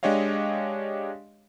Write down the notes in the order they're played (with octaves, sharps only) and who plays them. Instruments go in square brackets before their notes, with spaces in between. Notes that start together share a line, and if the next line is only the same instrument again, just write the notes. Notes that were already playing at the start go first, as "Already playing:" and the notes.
[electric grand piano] G#3 D4 G4 C#5 D#5 F5